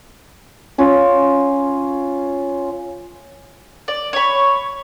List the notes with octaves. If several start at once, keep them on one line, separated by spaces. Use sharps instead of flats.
C#4 F4
D5
C#5 B5